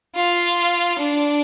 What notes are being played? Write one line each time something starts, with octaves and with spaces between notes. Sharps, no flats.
F4
D4